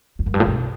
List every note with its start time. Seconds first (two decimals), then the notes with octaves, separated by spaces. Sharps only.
0.19 E2
0.26 F#2
0.34 G2
0.40 A2
0.47 B2